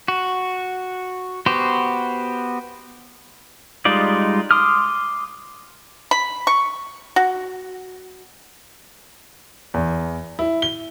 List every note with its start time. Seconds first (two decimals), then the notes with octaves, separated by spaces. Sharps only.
0.08 F#4
1.46 B3 F#4 G4 C5
3.85 G3 G#3 D#4 F4 D5
4.51 C6 D6 D#6 F6
6.11 B5
6.47 C#6
7.16 F#4
9.74 E2
10.39 E4
10.62 G7